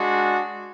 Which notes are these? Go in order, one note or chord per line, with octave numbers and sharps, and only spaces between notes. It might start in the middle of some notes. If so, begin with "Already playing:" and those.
Already playing: G#3 D4 F#4